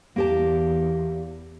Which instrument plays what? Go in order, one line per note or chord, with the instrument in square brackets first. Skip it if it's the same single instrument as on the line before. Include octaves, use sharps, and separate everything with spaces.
[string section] E2 [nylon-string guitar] A#3 G4 A5